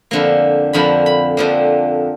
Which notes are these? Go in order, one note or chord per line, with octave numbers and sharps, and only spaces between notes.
F2 D3 F3 A#3
F2 D3 F3 A#3 B5
B5
F2 D3 F3 A#3